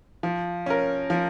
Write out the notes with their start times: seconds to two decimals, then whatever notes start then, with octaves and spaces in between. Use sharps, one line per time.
0.23 F3
0.66 C#4 A#4
1.10 F3